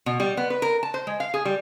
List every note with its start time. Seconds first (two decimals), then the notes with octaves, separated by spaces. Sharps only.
0.06 B2
0.20 G3
0.37 B3
0.50 B4
0.62 A#4
0.83 A5
0.94 C5
1.07 G#3
1.20 F5
1.34 G#4
1.45 G3